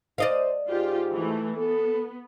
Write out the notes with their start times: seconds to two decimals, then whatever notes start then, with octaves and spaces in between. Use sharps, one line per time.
0.18 C5 D5 D#5 F5
0.68 G#2 F4 G4
1.12 E3 A3
1.57 B3 A4